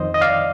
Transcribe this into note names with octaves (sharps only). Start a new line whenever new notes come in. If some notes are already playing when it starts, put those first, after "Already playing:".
Already playing: F2 D#3 C5 D#5
D#5
D5 F5